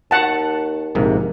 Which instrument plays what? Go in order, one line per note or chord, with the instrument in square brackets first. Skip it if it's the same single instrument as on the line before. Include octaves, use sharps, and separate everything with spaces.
[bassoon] D#2 [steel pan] F#5 A5
[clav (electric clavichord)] A#1 G#2 C3 [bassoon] A#3